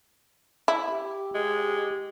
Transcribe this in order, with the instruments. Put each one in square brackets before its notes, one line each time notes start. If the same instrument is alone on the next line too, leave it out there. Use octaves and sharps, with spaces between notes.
[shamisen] E4
[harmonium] G4
[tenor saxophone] G#3 [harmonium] G4